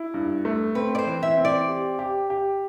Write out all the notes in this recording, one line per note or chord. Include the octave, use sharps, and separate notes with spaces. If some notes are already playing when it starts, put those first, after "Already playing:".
Already playing: E4
G2
A3
C4 B4
D5
C5
E3
E5
C4
D5
G4
G4
G4